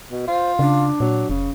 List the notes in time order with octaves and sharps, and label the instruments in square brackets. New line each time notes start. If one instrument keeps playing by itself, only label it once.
[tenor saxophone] B2
[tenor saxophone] F4 [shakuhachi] C5
[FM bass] C#3 [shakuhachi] D4
[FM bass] A#2 [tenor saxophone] F#3
[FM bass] F1 [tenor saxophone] C#3